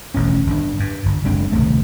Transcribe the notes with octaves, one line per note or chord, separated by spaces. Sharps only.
E1 A1 D3 C#4
G1 D4
G2
G1
F#1 G#3 C4 D4
D#1 C2 C#3 A3